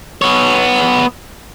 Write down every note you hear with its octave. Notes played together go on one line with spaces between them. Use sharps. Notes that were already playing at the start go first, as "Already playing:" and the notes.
B3 C#5